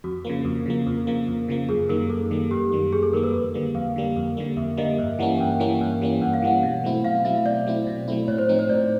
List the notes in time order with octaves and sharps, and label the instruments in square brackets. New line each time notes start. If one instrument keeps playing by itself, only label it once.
[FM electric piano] F2 [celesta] F#4
[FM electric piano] C#3 F3 A#3
F2
C#3 F3 A#3
F2
C#3 F3 A#3
F2
C#3 F3 A#3
[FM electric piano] F#2 [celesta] G#4
[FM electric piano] D#3 G3 A#3 [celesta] A#4
[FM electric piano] F#2 [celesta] A4
[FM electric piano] D#3 G3 A#3
[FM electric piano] F#2 [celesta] G4
[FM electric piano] D#3 G3 A#3
[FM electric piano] F#2 [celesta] G#4
[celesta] A4
[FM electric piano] D#3 G3 A#3 [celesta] A#4
[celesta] B4
[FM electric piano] F2
D3 G3 A#3
[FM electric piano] F2 [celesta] F5
[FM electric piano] D3 G3 A#3
F2
D3 G3 A#3
[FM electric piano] F2 [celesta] E5
[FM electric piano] D3 G3 A#3 [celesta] D#5
[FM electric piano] G2 [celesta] E5
[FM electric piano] E3 G3 A#3 C#4 [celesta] F#5
[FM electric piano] G2 [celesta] G5
[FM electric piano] E3 G3 A#3 C#4
G2
E3 G3 A#3 C#4
[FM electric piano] G2 [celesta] F#5
[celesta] F5
[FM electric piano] E3 G3 A#3 C#4 [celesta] F#5
[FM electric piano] B2
F#3 A3 C4 E4
[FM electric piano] B2 [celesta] F5
[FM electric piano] F#3 A3 C4 E4 [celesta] E5
[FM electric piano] B2 [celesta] D5
[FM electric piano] F#3 A3 C4 E4
B2
F#3 A3 C4 E4
[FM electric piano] A2 [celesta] C#5
[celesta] C5
[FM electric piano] F3 A3 C4 D#4
[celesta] C5
[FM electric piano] A2 [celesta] D5